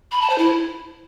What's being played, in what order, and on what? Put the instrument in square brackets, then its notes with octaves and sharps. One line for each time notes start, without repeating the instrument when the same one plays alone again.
[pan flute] B5
A5
C5
E4